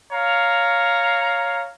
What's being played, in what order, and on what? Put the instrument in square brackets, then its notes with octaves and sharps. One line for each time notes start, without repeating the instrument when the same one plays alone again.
[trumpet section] C#5 F5 A#5